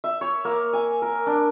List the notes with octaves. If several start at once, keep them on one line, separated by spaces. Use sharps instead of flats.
E5
C#5
A#3
G#5
A#4
D4